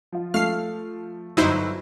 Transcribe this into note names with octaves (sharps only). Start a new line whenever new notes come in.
F3 F4
F3 A3 F5 F6 C7
G1 F#3 D#4 E4 C5 E6